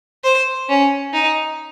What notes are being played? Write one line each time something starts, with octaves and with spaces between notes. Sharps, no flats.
C5
C#4
D#4